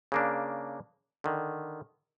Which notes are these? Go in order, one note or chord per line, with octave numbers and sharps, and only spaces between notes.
C#3 A#3 D4
D3 D#3